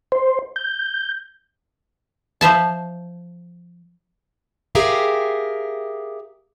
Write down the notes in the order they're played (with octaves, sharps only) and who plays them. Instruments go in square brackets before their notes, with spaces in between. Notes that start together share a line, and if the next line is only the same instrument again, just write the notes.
[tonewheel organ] C5
G6
[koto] F3 C5 E5 A5
[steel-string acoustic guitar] G4 G#4 A#4 E5 F5